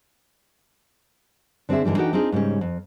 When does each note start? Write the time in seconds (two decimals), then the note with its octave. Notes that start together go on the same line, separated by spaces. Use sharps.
1.69 D3 C4 D4 G#4 E5
1.84 G#2 D3 E3 F#3 G3
1.97 E3 D4 D#4 F#4 A4 G5
2.13 C4 D4 D#4 F4 G#4
2.32 G#2 C#3 G3 C#4
2.61 F2